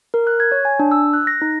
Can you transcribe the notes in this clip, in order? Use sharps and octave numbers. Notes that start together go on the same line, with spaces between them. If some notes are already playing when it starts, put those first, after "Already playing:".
A#4
F#6
G#6
C#5
G#5
D4
E6
F#6
A#6
D#4